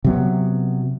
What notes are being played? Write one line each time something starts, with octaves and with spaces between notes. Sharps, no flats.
C3 F#3 B3